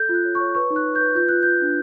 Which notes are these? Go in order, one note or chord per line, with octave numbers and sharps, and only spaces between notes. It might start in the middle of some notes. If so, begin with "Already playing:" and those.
Already playing: A4 G6
F4
F#6
C#5
C#5 C#6
B4 C#6
D#4
F#6
B4
G6
B4
F4 G6
F4 F#6
F4 G6
D4